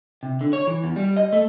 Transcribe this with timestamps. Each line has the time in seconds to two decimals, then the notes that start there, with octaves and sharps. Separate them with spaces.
0.23 C3
0.41 D3
0.53 C#5
0.67 E3
0.84 E2
0.96 G3
1.17 D#5
1.33 A3